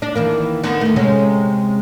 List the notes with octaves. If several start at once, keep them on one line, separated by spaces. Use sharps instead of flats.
D4
D#3 E3 A#3
D3 D#3 B3
E2 A3
C3 G#3 C#4